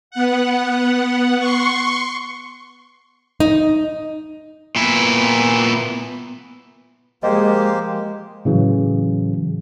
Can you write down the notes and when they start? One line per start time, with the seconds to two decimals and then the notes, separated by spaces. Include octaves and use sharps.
0.11 B3 F#5
1.38 C6 C#6
3.40 D#4
4.76 A#2 B3 E4
7.23 F3 G#3 A#3 G4 A#4 C5 D#5
8.45 A2 C#3 E3 F#3